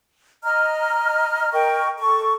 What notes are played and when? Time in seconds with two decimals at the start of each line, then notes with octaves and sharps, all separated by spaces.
0.42 D#5 A#5 F6
1.52 A#4 D#5 G5 C#6
1.98 A4 C#6